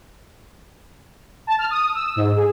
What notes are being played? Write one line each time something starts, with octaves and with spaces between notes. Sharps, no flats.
A5
F6
D#6
E6
G#2
G#4